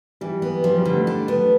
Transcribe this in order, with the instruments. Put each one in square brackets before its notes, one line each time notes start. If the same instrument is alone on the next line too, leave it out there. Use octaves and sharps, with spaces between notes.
[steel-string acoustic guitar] E3 [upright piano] G3
[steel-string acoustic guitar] B3
[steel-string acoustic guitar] F3 [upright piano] G3
[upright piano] G3
[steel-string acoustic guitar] D3
[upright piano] A3
[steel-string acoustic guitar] D4
B3